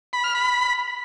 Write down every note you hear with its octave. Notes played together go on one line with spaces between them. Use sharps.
B5
F6
B5